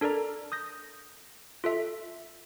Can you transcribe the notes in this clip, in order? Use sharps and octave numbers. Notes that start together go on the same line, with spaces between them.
D4 A4 A#4 D5 A#5
D#6 G6 A#6
F4 A4 E5